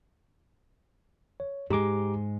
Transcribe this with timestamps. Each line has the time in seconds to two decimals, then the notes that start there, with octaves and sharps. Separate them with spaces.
1.40 C#5
1.70 G#2 G#3 G4 A#5 D6